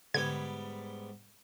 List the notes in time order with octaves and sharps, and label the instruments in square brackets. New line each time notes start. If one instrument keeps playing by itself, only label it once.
[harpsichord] G#2 G3 B3 [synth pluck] D3 G#6